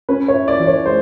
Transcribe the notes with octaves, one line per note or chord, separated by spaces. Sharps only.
C#4 B4
C#5
E4
D5
E3
C#5
G#3 C5